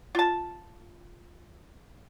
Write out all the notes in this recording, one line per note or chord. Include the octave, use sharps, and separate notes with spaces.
F4 A5